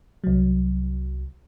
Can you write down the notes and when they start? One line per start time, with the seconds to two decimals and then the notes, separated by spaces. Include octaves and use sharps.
0.24 C2 F#3